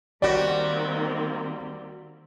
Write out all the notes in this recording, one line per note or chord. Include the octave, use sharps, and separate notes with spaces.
D#3 G3 A#3 C4 F#4 D5